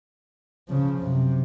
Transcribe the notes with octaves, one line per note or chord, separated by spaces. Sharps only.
C#3 F3
F#2 C3